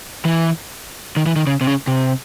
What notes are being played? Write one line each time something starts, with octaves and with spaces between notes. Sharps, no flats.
E3
D#3
E3
D#3
C#3
C3
C#3
C3